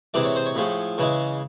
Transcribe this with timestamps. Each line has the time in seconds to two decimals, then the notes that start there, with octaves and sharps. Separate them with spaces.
0.14 C3 E3 G#3 D5
0.25 C#5
0.36 C5
0.46 C#5
0.55 A2 F3 G#3
0.98 C#3 E3 G#3